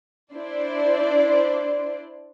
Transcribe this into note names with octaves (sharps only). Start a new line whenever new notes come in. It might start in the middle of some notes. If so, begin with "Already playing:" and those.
D4 E4 C5 D5